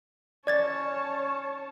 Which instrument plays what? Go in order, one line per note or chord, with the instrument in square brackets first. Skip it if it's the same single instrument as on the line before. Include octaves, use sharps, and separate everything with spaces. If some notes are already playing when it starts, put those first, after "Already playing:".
[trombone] C#4 [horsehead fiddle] C#5 A5 [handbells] D5 G#6 A6